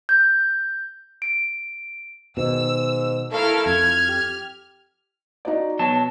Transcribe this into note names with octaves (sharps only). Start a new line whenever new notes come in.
G6
D7
G#2 B2 D#3 E6
A3 E4 A4 A#4 F5 F6
F2 F6 G#6
G4
D#4 F#4 D5
B2 F#3 A5